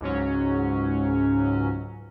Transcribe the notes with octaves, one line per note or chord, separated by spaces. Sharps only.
C#2 G#2 F#3 C#4